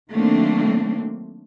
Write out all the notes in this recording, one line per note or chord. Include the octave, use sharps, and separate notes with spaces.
D#3 F#3 A3 A#3 C4 D4